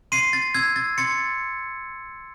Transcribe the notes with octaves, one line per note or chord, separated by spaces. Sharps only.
C6 C7 D#7
A6
E6 G#6
A6
C6 A6 C#7